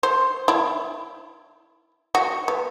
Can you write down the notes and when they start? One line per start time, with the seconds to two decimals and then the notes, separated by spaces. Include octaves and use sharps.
0.03 C5
0.48 E4
2.15 F#4
2.48 B3